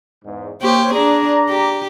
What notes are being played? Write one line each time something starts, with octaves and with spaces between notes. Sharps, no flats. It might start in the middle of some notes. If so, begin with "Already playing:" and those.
E2 G#2
A#3 G4 C5 C#5
D4 G#4 D5 A#5
G4